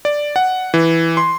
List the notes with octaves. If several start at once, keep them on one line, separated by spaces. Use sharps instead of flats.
D5
F#5
E3
C6